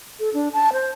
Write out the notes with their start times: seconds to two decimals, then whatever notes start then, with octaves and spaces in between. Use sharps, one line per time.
0.20 A4
0.34 D4
0.53 A5
0.73 C5